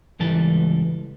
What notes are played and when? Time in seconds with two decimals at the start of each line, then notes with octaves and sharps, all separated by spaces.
0.19 C#2 G#2 E3 G3 A4 A5